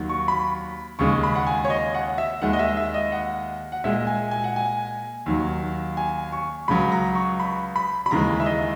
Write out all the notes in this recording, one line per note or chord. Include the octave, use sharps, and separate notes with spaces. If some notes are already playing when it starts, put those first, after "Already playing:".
Already playing: D#2 D#3 F#3
C#6
B5
D#2 C#3 G#3 C#6
B5
F#5
G#5
C#5
D#5
F#5
E5
D#2 D#3 G#3 F#5
D#5
E5
E5
D#5
F#5
F#5
A#2 G#3 E5
G#5
G#5
F#5
G#5
D#2 D#3 F#3
G#5
C#6
C#2 C#3 F#3 B5
A#5
C#6
B5
B5
B5
D#2 C#3 E3 G#3 A#5
E5
D#5